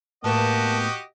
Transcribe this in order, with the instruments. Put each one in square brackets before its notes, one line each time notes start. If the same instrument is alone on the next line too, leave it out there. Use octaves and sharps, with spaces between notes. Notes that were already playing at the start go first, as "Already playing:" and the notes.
[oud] A2 B3 B4 [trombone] A#3 [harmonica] F#4 G4 D#5 [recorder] A5